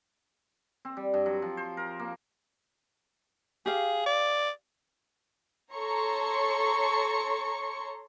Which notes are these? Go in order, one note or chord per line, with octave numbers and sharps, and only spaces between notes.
C4
G3
G2
F#3
F3
C5
A#4
A#3
G4 G#4 F5
D5
A4 C#5 A#5 C6 C#6 C#7